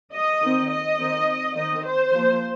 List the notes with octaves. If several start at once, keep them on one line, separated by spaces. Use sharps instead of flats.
D#5
D#3 C4
D#5
D#3 C4
D#3 C4 D#5
C5
F3 A#3